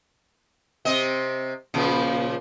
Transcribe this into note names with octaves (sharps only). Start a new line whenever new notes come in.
C3 C4 D#5
A#2 C#3 F3